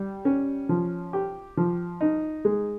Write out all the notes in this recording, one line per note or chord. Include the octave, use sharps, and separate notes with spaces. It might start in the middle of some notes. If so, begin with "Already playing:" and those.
Already playing: G3
C#4
F3
G4
F3
D#4
G#3